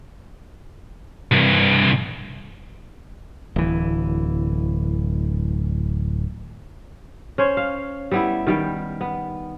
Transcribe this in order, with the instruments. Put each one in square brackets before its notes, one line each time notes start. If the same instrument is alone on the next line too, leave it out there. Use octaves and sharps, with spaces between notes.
[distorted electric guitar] C2 G2
[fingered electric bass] D1 E3
[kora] C#4 C5 C#5
F5
G3 B3 E4
D#3 G3 G5
B3